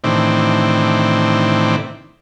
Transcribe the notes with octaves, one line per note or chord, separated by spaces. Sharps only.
A2 C3 D#3 E3 C4 D4